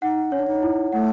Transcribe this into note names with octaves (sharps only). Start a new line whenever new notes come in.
D#4 F#5
C#4 C#5
D4
D#4
E4
A3 F#5